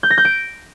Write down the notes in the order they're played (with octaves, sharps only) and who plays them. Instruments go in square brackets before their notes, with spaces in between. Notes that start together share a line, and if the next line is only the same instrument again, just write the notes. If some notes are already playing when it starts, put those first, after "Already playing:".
[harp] G6
A#6
G6
D7